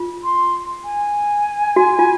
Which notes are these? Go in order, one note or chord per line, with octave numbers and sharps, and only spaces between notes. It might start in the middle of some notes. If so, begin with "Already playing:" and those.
Already playing: F4
C6
G#5
F#4
F4